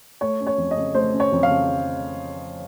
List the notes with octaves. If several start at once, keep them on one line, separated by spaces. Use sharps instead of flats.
A3 C#5
C#4
C#5
F2
D#5
C#3
A3 C5
C#4
C#5
F2
F5
C#3